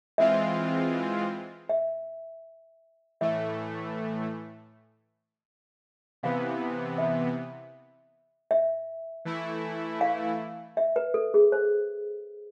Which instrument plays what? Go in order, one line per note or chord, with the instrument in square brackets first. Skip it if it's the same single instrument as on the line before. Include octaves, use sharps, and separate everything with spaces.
[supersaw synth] E3 G#3 C4 F4 [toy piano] E5
[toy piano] E5
[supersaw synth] A2 E3 A3 [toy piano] E5
[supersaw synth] C3 E3 B3 [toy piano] F5
[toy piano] E5
E5
[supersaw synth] E3 A3 E4
[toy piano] F5
E5
B4
A4
G#4
C5